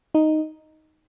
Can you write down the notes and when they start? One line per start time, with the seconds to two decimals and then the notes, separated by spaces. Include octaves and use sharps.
0.15 D#4